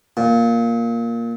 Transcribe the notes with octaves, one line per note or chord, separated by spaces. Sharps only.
A#2